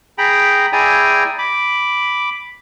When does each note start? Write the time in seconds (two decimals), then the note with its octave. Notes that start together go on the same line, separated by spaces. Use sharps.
0.18 G#4 G5 A#5 B5
0.73 E4 G#4 D5 G5 G#5 A#5
1.39 B5 D6